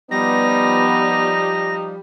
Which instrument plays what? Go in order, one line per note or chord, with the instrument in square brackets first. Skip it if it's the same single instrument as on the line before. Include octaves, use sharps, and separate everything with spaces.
[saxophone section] F3 G3 [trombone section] B3 [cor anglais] D#4 [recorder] A#6